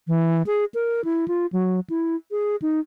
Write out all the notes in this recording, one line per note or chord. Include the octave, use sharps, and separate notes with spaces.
E3
G#4
A#4
E4
F4
F#3
E4
G#4
D#4